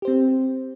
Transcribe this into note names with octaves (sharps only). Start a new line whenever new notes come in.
C4 G4 C5